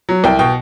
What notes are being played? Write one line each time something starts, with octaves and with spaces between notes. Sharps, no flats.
F#3
C2 G5
B2 G5